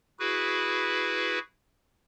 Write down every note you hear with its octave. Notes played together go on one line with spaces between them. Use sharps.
E4 F#4 G#4 B4